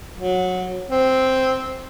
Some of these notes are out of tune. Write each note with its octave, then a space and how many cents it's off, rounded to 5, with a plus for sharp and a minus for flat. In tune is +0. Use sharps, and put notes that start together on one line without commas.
F#3 -15
C4 +0